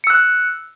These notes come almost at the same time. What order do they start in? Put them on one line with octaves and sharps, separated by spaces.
C#7 E6 F#6